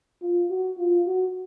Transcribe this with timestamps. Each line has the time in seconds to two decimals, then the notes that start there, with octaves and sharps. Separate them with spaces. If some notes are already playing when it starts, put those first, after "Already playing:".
0.22 F4
0.50 F#4
0.78 F4
1.07 F#4